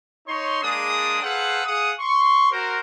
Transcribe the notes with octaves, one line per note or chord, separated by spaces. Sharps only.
D#4 C#5 C6
G#3 A#3 D4 G#4 D5 D#6
G#4 A4 B4 C5 F5 F#5
G#4 F5 F#5 D#6
C6 C#6
F#4 A#4 C5